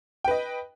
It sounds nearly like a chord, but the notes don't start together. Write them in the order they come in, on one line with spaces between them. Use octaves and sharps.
G5 B4 D#5